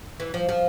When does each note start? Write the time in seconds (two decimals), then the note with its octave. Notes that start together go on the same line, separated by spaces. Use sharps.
0.20 E3
0.34 F3
0.49 F3